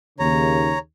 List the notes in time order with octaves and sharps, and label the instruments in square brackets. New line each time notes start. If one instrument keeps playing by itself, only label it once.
[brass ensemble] D#2 C#3 [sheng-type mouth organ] C#5 A#5